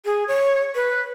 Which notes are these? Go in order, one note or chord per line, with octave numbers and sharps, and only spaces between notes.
G#4
C#5
B4